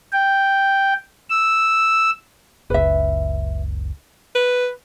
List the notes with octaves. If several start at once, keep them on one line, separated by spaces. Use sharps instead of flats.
G5
E6
F#1 C#2 B4 E5
B4